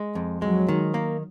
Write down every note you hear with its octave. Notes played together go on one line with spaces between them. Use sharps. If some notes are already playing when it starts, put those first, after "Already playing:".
Already playing: G#3
F2
F#3 G#3
D#3
A#3